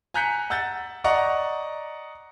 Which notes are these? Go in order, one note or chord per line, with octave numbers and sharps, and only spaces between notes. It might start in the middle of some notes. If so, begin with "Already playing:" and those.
G#5 A#5 F#6 G6 B6 C#7
F#5 E6 G6 A6
D5 D#5 F#5 A#5 C#6